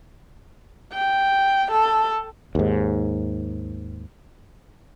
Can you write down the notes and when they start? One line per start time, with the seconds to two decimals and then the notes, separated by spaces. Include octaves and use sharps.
0.93 G5
1.72 A4
2.55 D#2 G#2